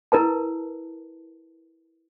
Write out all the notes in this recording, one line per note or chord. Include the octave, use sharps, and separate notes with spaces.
E4 A#4 B4 A5